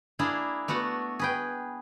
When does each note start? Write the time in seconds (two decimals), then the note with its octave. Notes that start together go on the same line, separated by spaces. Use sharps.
0.19 A#3 D4 E4 G#4
0.68 A3 B3 F#4 F#5
1.19 G#4 B4 G5